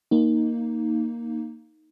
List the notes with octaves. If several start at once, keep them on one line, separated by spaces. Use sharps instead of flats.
A#3 D#4